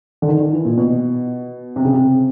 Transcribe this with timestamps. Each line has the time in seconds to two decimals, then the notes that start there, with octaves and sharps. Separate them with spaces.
0.22 D3
0.28 D#3
0.40 D#3
0.53 E3
0.65 A#2
0.78 B2
1.76 C3
1.84 C#3
1.93 C3